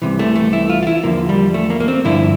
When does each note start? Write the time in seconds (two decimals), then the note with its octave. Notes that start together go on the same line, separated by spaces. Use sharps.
0.02 C2 C3 E3
0.19 A3
0.35 A3
0.53 E4
0.70 F4
0.83 F4
0.87 E4
1.03 E2 D3 F3 A#3
1.29 G3
1.54 A3
1.70 A#3
1.80 A#3
1.88 C4
2.05 G2 D3 F3 E4